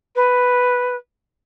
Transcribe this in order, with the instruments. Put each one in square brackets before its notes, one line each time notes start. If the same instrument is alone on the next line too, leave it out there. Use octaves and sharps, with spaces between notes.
[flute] B4